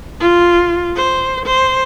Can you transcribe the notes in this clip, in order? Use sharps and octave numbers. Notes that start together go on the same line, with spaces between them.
F4
C5
C5